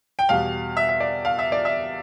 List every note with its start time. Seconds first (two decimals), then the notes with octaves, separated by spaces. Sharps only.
0.19 G5
0.29 E2 B2 G3 F5
0.77 E5
0.89 E5
1.00 D5
1.25 F5
1.39 E5
1.52 D5
1.65 E5